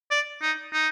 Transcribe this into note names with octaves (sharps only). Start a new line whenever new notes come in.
D5
D#4
D#4